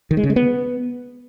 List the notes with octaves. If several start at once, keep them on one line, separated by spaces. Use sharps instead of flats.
D#3
G#3
C#3
G#3
B3